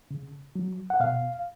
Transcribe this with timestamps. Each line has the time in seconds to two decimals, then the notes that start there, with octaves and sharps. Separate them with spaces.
0.11 C#3
0.56 F#3
0.90 F#5
1.00 B2 F5